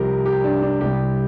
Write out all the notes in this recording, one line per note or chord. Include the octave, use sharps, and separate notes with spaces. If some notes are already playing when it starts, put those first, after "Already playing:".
Already playing: C2 C3 F3 G4 A#4
G4
D4
D4
C2 C3 G3 G4